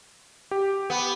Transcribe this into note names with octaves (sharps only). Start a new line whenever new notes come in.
G4
B3